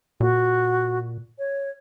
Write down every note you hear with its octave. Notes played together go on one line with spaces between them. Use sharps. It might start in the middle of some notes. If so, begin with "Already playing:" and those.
A#2 F#4
C#5